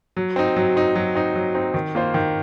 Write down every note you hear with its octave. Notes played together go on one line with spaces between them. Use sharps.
F#3
C4 D#4
F#3
C4 D#4
F#3
C4 D#4
F#3
C4 D#4
D#3
A#3 F4 C5
D#3